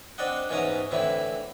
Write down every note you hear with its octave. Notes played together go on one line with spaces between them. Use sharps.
C4 D4 D5 D#5 F#5
G#2 E3 B3 C#4 A#5 D#6
A2 D3 E3 C4 E4